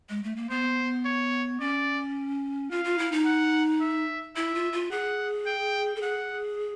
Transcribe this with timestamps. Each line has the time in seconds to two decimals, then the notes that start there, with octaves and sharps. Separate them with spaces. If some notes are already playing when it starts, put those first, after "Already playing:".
0.10 G#3
0.23 A3
0.36 A#3
0.50 B3 C5
1.05 C#5
1.60 C#4 D5
2.71 F4 F5
2.85 F4
2.98 E4
3.12 D#4
3.25 F#5
3.81 E5
4.36 E4 E5
4.55 F4
4.73 F4
4.91 G#4 F#5
5.46 G5
5.96 A4
6.02 G#4 F#5